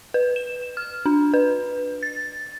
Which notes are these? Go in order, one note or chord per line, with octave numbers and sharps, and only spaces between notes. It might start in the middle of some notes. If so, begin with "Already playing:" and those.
B4
E7
F6
D4
B4
A6